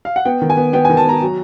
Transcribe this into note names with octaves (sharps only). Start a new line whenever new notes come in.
F5
F#5
B3 G5
D#3
G#5
B3
B3 G5
D#3 G#5
A5
B3 A#5
F#3